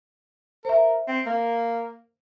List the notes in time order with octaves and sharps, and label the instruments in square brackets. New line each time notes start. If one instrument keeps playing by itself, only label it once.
[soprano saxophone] A#4 [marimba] C5 E5
[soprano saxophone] C4
A#3